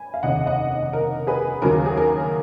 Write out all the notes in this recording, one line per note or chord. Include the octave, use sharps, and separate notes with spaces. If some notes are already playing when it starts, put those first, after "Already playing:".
Already playing: G#5 B5
F5
F1 D#2 C#3 D#5 F#5
D#5 F#5
A#4
G#4 B4
D#2 C#3 F#3 A#4
G#4
A#4